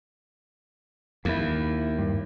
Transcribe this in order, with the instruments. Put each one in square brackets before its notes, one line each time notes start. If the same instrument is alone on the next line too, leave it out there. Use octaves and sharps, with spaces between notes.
[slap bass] D#2 [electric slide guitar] A#3 E4
[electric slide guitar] G2